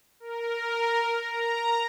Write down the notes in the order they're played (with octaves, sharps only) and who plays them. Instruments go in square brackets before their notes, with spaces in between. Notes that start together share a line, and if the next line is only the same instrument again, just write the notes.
[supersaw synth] A#4
A#5